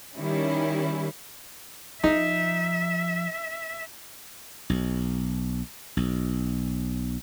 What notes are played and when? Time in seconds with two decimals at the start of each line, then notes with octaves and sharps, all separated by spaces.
0.19 D#3 G3 C#4 E4
2.04 F3 D#4 E5
4.70 B1
5.97 B1